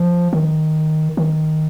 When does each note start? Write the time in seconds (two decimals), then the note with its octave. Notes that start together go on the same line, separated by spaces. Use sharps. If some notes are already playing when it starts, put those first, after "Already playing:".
Already playing: F3
0.33 D#3
1.17 D#3